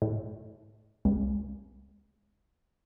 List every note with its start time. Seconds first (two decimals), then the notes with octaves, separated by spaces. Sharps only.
0.02 A2
1.05 C#2